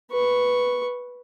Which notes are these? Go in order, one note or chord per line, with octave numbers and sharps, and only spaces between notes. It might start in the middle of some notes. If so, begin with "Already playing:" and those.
B4 C#6